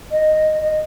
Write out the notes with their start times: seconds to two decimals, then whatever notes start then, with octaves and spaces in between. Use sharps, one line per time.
0.11 D#5
0.62 D#5